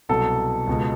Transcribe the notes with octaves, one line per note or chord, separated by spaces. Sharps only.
C2 B2 F#3 A4
C#2 B2 G#3